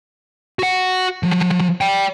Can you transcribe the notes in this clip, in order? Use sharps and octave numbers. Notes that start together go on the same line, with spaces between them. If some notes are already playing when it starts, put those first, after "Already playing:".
F#4 F#5
F3 F#3
D5 G5